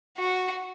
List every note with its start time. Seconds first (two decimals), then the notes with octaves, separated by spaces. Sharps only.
0.17 F#4